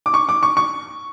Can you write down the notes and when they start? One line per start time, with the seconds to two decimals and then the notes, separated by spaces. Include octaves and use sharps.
0.06 D6
0.14 C#6
0.29 D6
0.43 C#6
0.57 C#6